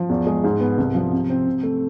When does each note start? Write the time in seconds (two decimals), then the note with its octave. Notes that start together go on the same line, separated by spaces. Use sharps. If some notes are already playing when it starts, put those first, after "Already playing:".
Already playing: F3
0.09 E2
0.27 G#3
0.44 G#2
0.60 B3
0.78 C2
0.95 F3
1.13 C3
1.30 C4
1.47 C3
1.63 A3